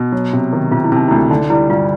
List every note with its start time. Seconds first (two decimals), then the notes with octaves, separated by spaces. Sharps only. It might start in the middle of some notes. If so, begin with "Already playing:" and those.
Already playing: B2
0.12 F#3
0.33 C3
0.53 D#3
0.71 C3 F4
0.84 E4
0.92 C3 D#4
1.08 D2 E4
1.30 D3 D#4
1.50 G3 E4
1.70 G2 F4